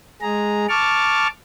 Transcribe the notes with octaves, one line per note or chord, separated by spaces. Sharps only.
G#3 G#4 A#5
A5 C#6 D6 F6